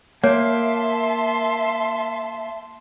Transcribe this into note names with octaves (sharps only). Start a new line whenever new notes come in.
A#3 C#5 E5 A5 C6